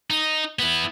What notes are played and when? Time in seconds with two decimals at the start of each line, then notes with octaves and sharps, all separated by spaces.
0.10 D#4
0.59 B3 E4